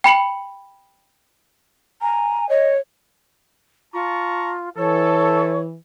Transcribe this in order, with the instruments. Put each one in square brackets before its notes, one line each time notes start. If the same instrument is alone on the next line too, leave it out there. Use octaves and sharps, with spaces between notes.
[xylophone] G5 B5 C#7 F#7
[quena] G#5 [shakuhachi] A#5
[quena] C#5 [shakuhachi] D#5
[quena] F4 [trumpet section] A5 A#5 C#6
[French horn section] E3 [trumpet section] A4 [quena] C#5